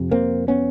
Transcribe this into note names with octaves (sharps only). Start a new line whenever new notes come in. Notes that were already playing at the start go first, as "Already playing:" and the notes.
Already playing: F2 C3
A#3 C4
B3 C#4